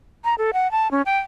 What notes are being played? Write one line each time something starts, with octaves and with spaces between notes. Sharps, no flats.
A#5
A4
F#5
A5
C#4
G5